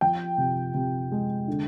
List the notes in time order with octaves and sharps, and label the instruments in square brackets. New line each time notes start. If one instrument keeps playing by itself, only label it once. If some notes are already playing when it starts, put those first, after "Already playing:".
[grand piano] F3 G5
C3
C3
G#3
D3